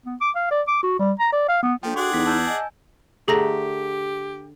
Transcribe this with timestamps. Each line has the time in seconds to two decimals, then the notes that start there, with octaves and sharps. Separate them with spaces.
0.06 B3
0.21 D6
0.36 F5
0.51 D5
0.68 D6
0.83 F#4
0.99 G3
1.19 A#5
1.33 D5
1.48 F5
1.63 B3
1.83 F3 A#3 D4 A4 G5
1.96 F#4 G#4 D5 F#5 C6 F#6
2.13 E2 D#4 B6
2.26 A5 E6 G6
2.47 D#5 G#5
3.28 D3 A3 G4 G#4 A#5 A#6